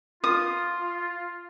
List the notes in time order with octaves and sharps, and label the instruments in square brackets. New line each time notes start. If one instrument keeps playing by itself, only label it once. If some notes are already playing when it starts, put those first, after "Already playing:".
[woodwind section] F4 [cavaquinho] D#6